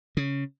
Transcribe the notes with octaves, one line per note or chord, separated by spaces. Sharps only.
C#3